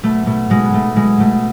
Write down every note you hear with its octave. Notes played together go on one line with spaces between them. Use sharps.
B2 A3
B2 A3
B2 G#3
B3
B2 A3
B2 G#3
B2 A3